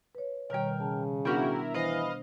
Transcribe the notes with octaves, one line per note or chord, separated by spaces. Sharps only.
B4 C#5
B2 D#3 G3 A#4 C#5 G5
C#3 A5
B3 D4 E4 F#4 A#4 G5
E3 B4 C5 D#5 F5